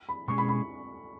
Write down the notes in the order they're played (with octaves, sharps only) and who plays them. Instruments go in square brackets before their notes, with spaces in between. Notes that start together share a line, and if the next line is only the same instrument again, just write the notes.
[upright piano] B5
[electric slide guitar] B2 G#3 C#4 G#4 [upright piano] C#6
[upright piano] B5
B5